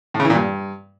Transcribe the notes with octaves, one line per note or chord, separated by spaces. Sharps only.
A2
C#3
E3
A#2
G2